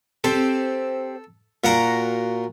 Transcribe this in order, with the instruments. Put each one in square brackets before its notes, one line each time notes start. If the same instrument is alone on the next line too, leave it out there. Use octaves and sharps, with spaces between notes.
[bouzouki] C4 G4 C5 [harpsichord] A4
[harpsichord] A#2 F#5 A#5 [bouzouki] F#4 A#4 F5